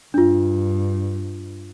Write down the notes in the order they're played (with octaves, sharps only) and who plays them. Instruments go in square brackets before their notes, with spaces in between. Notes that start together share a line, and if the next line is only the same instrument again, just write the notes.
[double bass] G2 [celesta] D4 F4